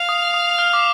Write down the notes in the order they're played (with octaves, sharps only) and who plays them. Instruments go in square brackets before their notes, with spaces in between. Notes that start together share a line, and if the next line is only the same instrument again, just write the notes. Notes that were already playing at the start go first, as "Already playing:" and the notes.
Already playing: [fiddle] F5
[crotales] D#6
D#6
F6
D6